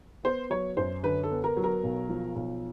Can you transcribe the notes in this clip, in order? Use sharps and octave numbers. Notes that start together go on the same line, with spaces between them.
B3 C5
F#3 C#5
F#2 C5
D3 B4
A4
B3
A#4
F#3
A#4
B1
F3
B1